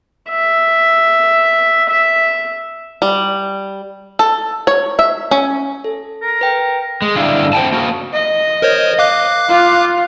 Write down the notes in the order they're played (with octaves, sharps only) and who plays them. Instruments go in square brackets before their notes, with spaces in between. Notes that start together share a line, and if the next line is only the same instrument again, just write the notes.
[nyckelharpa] E5
E5
[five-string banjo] G3
A4
C#5
E5
C#4
[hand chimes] A4
[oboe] A#4
[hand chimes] B4 G5
[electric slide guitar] G#3
G2 D3 E4 G4 F5
C5 F#5 G5 A5
A#3 F#4
[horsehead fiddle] D#5
[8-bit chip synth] A#4 C5 C#5
F5 D6 F#6
[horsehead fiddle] F4